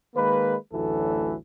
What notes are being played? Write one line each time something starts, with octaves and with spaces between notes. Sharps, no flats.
D#3 G#3 A#3 B4
A1 D2 E3 F#3 A4